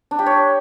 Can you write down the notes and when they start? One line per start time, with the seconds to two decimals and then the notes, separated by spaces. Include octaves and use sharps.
0.11 D4
0.19 G4
0.26 C#5